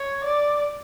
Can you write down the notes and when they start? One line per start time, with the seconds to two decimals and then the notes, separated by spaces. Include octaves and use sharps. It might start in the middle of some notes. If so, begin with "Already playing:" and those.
Already playing: C#5
0.24 D5